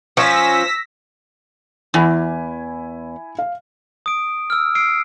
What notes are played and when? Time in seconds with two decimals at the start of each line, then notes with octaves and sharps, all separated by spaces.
0.17 F3 C#4 E6 A#6 B6
1.94 E2 E4 G#5 B5
3.39 F5
4.06 D#6 D7
4.50 E6 F6
4.75 E6 C7 D7